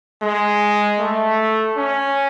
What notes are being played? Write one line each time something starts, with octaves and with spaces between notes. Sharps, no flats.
G#3
A3
C#4